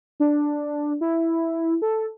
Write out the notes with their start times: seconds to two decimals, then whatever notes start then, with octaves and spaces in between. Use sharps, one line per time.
0.20 D4
1.01 E4
1.82 A4